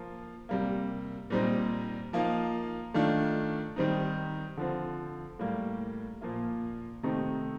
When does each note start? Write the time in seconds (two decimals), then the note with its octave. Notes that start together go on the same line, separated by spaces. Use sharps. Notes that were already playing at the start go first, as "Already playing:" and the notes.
Already playing: F3 A#3 F4
0.49 C3 G3 A#3
1.30 A#2 G3 C4 D#4
2.13 F3 A#3 D#4
2.94 D#3 A3 D4 F4
3.76 D#3 G3 C4 D#4
4.57 D3 F3 C4
5.39 A2 G3 A#3
6.21 A#2 F3 A#3 F4
7.03 C3 D#3 A3 C4 D#4